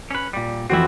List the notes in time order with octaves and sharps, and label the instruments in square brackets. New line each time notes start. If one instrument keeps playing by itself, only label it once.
[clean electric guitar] C#4 B4
A#2 G3
[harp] F2 E3 F#4 [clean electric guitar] C4 E4